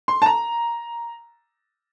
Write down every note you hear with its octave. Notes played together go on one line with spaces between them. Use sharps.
C6
A5
A#5